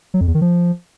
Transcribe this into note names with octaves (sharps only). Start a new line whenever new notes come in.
F#3
F2
E2
D#3
F3